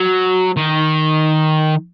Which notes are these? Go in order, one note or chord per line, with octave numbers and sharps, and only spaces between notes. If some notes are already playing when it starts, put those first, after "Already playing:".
Already playing: F#3
D#3